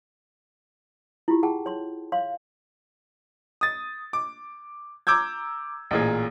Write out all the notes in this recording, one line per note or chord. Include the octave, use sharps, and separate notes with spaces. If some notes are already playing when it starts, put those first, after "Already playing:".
E4 F4 G4
G#4 F#5 G5 A5
C#5 C6
C#5 F5 C6
D#6 A6
D6
A#5 D6 E6 G6 G#6
A1 A#2 G#4